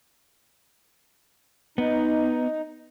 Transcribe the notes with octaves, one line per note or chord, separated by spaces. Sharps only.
B3 D#4